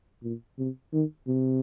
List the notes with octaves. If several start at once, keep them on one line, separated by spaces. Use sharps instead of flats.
A#2
C3
D#3
C3